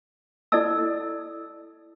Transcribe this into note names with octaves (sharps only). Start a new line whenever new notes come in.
E4 A4 D5 D#5 A5 E6